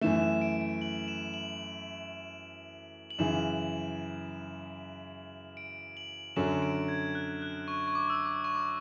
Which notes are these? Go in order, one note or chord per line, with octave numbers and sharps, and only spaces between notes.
F#2 E3 A3 E7
E7
D7
D7
F#7
E7
F#7
F#7
F#2 C#3 E3 E7
D7
F#7
F#2 D3 F#3 C#4 E7
D7
G#6
F#6
F#6
C#6
C#6
D6
E6
D6
D6
C#6
C#6
D6